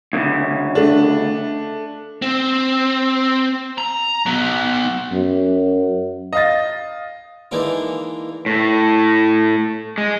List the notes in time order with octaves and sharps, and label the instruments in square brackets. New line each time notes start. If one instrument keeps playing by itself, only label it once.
[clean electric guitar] D2 A2 C#3
[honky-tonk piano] A3 D4
[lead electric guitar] C4
A#5
F#3 B3
[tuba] F#2
[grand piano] D#5 F5 A6
[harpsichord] E3 G#3 A#3 D4 D#4
[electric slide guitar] A2
G#3